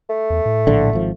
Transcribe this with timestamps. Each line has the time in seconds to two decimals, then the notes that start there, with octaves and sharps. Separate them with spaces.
0.10 A3
0.30 E2
0.45 A2
0.67 A#1 D3
0.93 G#1 F3